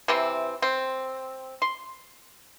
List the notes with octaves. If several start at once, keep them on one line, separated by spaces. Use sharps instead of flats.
C3 E3 C4
C4
C6